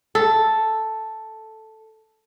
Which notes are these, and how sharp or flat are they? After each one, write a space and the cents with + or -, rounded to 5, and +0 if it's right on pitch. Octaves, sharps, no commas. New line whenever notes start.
A4 +0